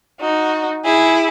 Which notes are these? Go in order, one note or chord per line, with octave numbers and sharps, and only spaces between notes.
D#4 F#4
E4 G#4